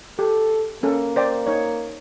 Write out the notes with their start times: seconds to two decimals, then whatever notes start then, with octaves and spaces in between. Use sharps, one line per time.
0.19 G4 A4
0.83 A#3 C#4 A4
1.16 C5 D5 G5
1.47 D#4 C#5